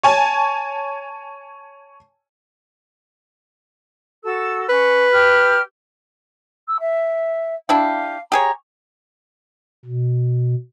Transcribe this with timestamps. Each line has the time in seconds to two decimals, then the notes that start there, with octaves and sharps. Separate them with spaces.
0.03 C#5 G#5 A5
4.23 F#4 A4 E6
4.69 C#4 B4
5.11 G4 F6
6.68 E6
6.80 E5
7.69 D4 E4 G4 F5
8.32 G4 G#4 C#5 A#5
9.85 B2